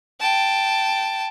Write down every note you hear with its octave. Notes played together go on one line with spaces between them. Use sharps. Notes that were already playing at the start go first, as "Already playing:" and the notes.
G5 A5